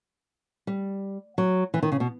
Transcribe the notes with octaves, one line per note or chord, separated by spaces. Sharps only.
G3
F#3
E3
D#3
C#3
B2